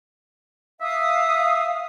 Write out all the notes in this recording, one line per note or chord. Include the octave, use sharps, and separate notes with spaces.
E5 F5 D#6